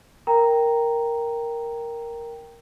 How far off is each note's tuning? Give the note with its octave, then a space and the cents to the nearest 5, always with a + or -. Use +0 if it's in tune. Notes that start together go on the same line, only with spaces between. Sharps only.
A#4 +0 G5 +0 A#5 +0